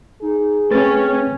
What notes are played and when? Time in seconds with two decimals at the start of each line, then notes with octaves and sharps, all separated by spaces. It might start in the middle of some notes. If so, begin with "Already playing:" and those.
0.22 D#4 G#4
0.71 A3 C4 C#4 B4 A6